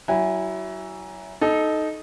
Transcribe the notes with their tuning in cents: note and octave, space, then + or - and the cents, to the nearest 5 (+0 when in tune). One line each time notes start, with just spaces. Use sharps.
F#3 +30 E4 +0 G#5 -15
D#4 +0 A4 -20